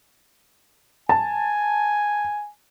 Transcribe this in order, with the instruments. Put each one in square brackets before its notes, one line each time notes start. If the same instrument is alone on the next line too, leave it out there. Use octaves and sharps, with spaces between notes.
[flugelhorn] G#5 [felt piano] A5